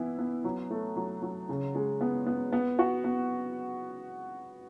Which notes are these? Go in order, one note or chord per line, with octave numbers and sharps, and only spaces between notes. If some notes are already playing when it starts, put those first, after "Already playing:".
Already playing: E3 B3 E4
B3
F#3
A3
F#3
F#3
C#3
G#3
B3
B3
B3
F#4
B3